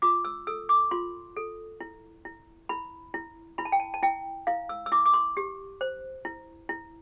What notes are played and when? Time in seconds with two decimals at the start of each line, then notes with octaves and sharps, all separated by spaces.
0.02 F4 D6
0.25 E6
0.47 A4 E6
0.69 D6
0.91 F4 C6
1.37 A4
1.80 E4
2.25 E4
2.69 E4 B5
3.14 E4
3.58 E4 B5
3.65 A5
3.72 G5
3.80 A5
3.94 A5
4.03 E4 G5
4.47 E4 F5
4.69 E6
4.86 E6
4.92 E4 D6
5.06 D6
5.14 C6
5.37 G4
5.81 C5
6.25 E4
6.69 E4